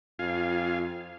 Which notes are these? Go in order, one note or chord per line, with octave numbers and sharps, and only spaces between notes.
F2 F4 F5 G#5